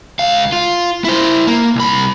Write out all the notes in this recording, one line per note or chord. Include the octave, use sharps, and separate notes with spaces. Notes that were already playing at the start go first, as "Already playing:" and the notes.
C#2 F5
F4
E4 C5
A#3
C2 B5